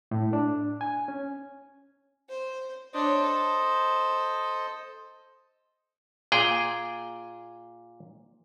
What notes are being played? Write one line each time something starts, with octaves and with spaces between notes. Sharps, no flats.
A2
D4
G#5
C#4
C5
D4 C5 C#5 D#5
A4
A#2 G#4 G5